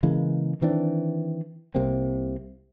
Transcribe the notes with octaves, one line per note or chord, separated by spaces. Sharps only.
C#3 E3 G#3 A#3
D#3 E3 C4 D4
C2 C3 A#3 C4